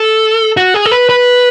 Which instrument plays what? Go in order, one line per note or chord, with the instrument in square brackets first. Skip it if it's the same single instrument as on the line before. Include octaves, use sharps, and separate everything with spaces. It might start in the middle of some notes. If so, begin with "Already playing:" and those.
Already playing: [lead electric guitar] A4
F#4
G#4
A4
B4
B4